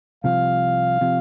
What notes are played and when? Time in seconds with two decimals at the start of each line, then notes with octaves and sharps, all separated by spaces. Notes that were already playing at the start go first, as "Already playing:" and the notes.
0.24 C2 C3 F3 F5
1.01 C3 F3